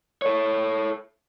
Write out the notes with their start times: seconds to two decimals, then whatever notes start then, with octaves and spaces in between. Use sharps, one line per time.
0.22 A4 C#5